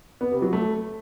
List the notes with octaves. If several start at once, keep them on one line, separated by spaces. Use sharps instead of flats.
B3
C3
F#3
A3